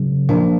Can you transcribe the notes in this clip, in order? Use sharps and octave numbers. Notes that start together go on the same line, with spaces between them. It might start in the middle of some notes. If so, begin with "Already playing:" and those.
Already playing: C#3 F#3
A#2 F3 A#3 D4